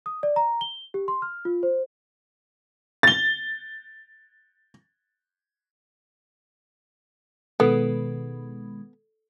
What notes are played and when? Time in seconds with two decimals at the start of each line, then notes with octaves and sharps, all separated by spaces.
0.06 D#6
0.23 D5
0.36 A#5
0.61 G7
0.94 G4
1.08 C6
1.22 F6
1.45 F4
1.63 C5
3.03 A6 G7
7.60 B2 D#3 G#3 B3 A4